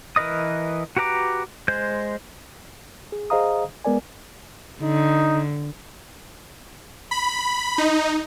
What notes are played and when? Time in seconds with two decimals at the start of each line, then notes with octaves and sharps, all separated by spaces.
0.16 E3 A#4 B4 D#5 D#6
0.97 F#4 G4 B4 A#5 D6
1.68 G#3 C5 G6
3.12 G#4
3.30 G#4 C5 D#5 F5 A#5 D#6
3.85 G#3 B3 A#4 D5 G#5
4.83 D3 D#4
7.11 B5
7.78 D#4